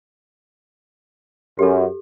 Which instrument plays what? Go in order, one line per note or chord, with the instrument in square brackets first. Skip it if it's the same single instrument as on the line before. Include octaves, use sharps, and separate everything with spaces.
[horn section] F#2 [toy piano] G4 A4